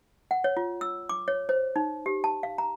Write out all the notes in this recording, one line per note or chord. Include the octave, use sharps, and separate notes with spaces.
F#5
C#5
F4
E6
D6
C#5
C5
D#4
G4
A5
F5
A#5